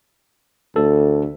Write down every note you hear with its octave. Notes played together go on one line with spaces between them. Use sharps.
D2 A4